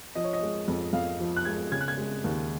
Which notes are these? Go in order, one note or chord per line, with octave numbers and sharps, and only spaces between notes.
F3 D#5
C#5
D#5
G#3
F2
F2 F5
F3
F#6
G#3 G#6
C#3 G#6
F#6
G#6
G#3
D#2